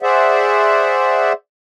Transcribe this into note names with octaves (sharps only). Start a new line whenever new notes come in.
G#4 C5 D5 E5 F#5